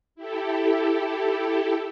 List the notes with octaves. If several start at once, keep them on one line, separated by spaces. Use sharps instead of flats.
E4 G4 A4